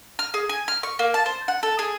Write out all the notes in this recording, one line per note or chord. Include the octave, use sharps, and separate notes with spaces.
F6
G#4
G#5
F6
C#6
A#3
A5
C5
F#5
A4
G#4